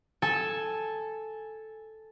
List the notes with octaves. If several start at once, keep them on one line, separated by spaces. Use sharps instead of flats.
A4 G#5 E6